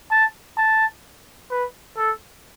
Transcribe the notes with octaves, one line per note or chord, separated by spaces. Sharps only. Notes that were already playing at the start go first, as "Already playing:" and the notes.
A5
A5
B4
A4